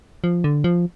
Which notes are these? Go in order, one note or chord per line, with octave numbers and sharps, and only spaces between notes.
F3
D3
F3